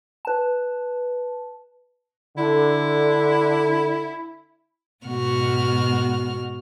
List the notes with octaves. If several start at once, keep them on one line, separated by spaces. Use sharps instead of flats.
B4 A5
D3 E4
G#2 B2 F#4 F6